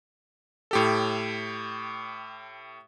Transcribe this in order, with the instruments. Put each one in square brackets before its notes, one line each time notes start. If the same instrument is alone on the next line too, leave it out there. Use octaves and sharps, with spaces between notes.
[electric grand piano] A2 G4 A4